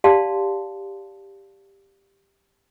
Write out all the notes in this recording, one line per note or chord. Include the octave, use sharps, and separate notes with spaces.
G4 D5 F5 A5 C6